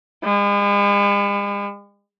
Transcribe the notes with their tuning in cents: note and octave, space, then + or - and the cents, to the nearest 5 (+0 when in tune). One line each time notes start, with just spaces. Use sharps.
G#3 -45